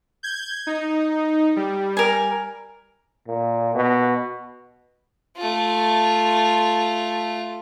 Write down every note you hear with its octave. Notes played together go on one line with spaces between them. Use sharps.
G6 G#6
D#4
G3
A#4 G#5
A#2
B2
A3 F4